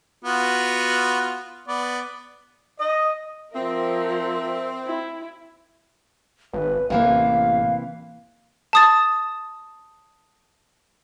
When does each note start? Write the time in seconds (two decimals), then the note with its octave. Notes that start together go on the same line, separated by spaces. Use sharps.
0.24 B3 F4 F#4
1.68 B3 D5
2.80 D#5
3.55 F3 C4 A#4 E5
4.85 E4
6.53 G#1 B4
6.90 A1 C3 E3 A#3 F5
8.73 A5 D#6 A6